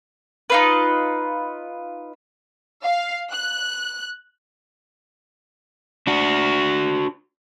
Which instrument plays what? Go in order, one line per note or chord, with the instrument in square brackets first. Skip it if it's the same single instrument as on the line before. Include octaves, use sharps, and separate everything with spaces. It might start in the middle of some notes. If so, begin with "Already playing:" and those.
[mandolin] D#4 F4 B4
[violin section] F5
F#6
[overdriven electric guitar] D4 F#4